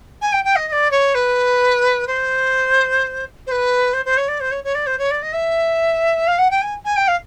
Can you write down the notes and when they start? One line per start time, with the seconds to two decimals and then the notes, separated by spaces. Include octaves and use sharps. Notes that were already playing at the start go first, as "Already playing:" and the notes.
0.21 G#5
0.32 G5
0.44 G5
0.56 D#5
0.68 D#5
0.72 D5
0.91 C#5
1.15 B4
2.07 C5
3.47 C5
3.51 B4
3.93 C5
4.05 C5
4.17 C#5
4.28 D5
4.40 C5
4.51 C#5
4.64 C#5
4.75 D5
4.86 C5
4.99 C#5
5.11 D5
5.22 D#5
5.33 E5
6.27 F5
6.38 F#5
6.50 G5
6.62 G#5
6.85 G#5
6.96 G5
7.08 F5